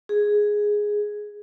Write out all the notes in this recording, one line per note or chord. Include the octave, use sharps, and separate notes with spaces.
G#4